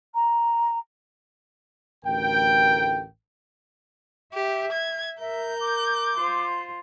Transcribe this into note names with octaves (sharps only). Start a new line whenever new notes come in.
A#5
A1 D2 A#4 G5
G4 E5
G#6
A#4 E5 G6
D6
F4 C5